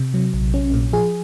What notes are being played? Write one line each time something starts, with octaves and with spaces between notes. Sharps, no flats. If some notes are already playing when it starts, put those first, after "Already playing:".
Already playing: C3
F#3
A#1
C#4
A#2
F3 G#4